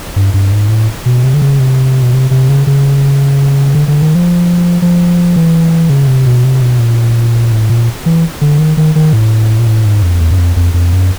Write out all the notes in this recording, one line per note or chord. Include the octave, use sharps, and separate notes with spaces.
G2
G2
G#2
A2
B2
C3
D3
C#3
C3
B2
C3
C3
C#3
C#3
D3
D3
D#3
F3
F3
E3
C#3
C3
B2
C3
B2
A#2
A2
A#2
E3
D3
D#3
D#3
D#3
A2
A#2
A2
G#2
F2
E2
F#2
F2
F2
F2
F#2